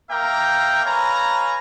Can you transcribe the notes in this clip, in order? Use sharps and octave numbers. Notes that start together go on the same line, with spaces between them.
A#3 A#4 E5 F5 G5 A#5
B4 C#5 F5 G#5 A#5